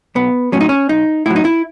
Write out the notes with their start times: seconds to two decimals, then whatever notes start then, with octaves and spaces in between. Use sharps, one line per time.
0.15 B1 B3
0.52 A2 F#3 C#4
0.60 D#4
0.69 C#4
0.89 B1 D#4
1.26 A2 F#3 E4
1.36 D#4
1.45 E4